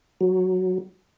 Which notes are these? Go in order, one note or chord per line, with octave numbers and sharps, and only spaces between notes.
F#3